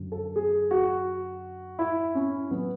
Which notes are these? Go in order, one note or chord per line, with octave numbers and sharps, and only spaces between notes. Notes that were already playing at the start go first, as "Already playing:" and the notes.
Already playing: F#2 D3 F#3
A4
G#4
F#4
E4
C#4
F#3 B3